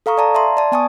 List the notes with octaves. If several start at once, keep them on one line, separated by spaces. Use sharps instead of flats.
A4 F5 A#5 C#6 D#6
D5 F5 A5 A#5
E5 A5 C6
D5 A5
B3 G#5 A5 C#6 D#6